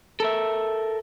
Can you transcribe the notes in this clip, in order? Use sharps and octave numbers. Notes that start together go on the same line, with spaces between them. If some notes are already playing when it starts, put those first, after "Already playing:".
A4 A#4 E5